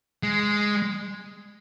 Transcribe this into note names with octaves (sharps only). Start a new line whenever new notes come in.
G#3